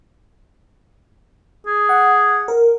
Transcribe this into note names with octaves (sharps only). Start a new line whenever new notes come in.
G#4
F#5
A#4